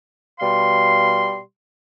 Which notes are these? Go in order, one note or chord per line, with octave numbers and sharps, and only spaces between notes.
B2 G3 F5 C6